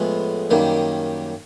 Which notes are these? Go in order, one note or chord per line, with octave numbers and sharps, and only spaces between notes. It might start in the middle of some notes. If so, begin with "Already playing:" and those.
Already playing: A2 F3 G#3 B3
F#2 D#3 G3 A#3